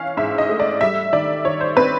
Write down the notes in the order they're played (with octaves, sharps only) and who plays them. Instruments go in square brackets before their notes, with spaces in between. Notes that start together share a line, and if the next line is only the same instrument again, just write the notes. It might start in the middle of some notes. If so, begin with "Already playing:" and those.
Already playing: [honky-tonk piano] E3 C#4 F5
G#2 E5
D#5
A3
D5
G3 E5
D#3 D5
D#3 C#5
C5
C4 B4